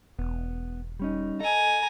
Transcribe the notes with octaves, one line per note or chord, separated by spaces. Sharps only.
E1 B3
G3 C#4 D#4
A4 D#5 G#5 A#5